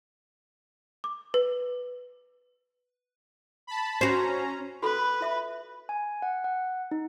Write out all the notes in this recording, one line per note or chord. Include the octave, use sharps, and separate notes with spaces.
D6
B4
A5 B5
C#4 F#4 C5 A#5
F#4 A4 B4 B5
F4 E5 D#6
G#5
F#5
F#5
D#4